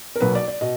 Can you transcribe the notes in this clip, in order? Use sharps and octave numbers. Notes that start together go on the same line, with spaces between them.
A#4
B1 B2 F#3 A#3 B4
D5
D5
B2 D#5